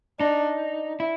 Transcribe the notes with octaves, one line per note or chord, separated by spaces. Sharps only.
D4 D#4
E4